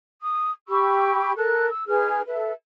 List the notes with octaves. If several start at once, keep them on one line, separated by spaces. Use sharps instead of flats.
D#6
G4 B5 C#6 E6
A4 A#4 F#6
E6
D#4 G#4 B4 F6
A4 B4 E5